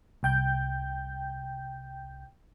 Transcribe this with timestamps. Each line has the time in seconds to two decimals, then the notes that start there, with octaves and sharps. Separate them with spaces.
0.23 C2 G5 G6